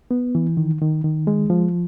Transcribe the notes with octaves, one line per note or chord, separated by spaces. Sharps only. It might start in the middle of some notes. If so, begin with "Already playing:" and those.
B3
E3
D#3
D#3
D#3
G#3
F3